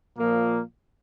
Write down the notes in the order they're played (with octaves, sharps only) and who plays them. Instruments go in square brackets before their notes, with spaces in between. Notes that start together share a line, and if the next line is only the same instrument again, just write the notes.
[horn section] A#2 F3 A#3